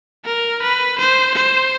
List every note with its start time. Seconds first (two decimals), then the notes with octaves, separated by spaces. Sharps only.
0.25 A#4
0.63 B4
0.99 C5
1.35 C5